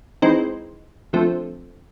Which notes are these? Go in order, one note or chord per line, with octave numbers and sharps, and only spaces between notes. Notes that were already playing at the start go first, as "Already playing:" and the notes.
E3 G#3 C4 D#4 C6
D3 F3 A3 C4